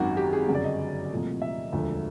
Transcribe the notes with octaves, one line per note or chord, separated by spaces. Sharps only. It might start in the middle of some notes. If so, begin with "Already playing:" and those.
Already playing: G#1 F#2 D#3 F#4
G4
G#4
G1 F#2 C#3 F#3
D5
D#5
C2 A#2 F3 A3
E5
E1 D2 D3 F3